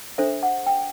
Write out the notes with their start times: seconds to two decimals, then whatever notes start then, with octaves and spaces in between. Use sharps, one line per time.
0.18 D4 A4 C5 E5
0.43 F#5
0.67 G5